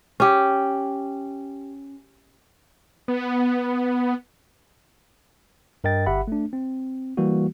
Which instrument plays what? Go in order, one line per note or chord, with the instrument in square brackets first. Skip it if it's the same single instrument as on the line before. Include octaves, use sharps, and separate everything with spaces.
[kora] C#4 G4
[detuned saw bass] B3
[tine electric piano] G2 A#4 D#5 G5 A6
G1 G4 E5 F#5 B5
A3 D4
C4
E3 G3 A#3 F#4